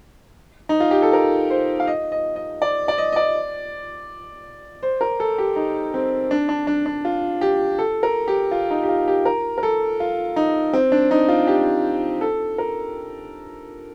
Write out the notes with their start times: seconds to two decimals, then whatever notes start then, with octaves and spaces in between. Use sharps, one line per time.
0.69 D#4
0.80 F4
0.91 G4
1.02 A4
1.13 A#4
1.50 C5
1.80 F5
1.87 D#5
2.12 D#5
2.36 D#5
2.62 D5
2.88 D5
2.98 D#5
3.12 D#5
3.16 D5
4.83 C5
5.01 A#4
5.20 A4
5.38 G4
5.56 D#4
5.94 C4
6.31 D4
6.49 D4
6.67 D4
6.86 D4
7.05 F4
7.41 G4
7.79 A4
8.03 A#4
8.28 G4
8.51 F4
8.71 D#4
8.83 G4
8.89 F4
9.08 G4
9.25 A#4
9.58 A#4
9.63 A4
10.00 F4
10.36 D#4
10.73 C4
10.92 D4
11.11 D#4
11.29 F4
11.47 G4
12.21 A4
12.58 A#4